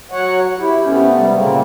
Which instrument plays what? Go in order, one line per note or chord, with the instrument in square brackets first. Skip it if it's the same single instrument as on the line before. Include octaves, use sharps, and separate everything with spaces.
[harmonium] F#3 C#5 F#5
[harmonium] E4 [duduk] G4
[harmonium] C3 A3 B3 [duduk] C#4
[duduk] G3
[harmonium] A#2 A#3 C4 [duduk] C#3